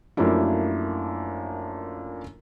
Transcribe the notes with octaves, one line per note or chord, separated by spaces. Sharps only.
F#2 F3 A3 A#3 D4 E4